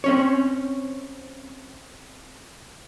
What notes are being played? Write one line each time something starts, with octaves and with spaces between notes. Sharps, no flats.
C4 C#4 C#5